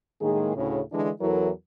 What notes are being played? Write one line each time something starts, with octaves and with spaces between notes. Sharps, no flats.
A2 D#3 G#3 A#3 G#4
D2 A2 C#3
D3 E3 G#3 D4
E2 E3 F#3 E4 A4 A#4